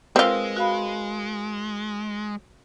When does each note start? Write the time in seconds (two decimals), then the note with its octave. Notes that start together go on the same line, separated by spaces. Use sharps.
0.16 G#3 C4 F4 A#4 B4 E6
0.57 F#4 F5 B5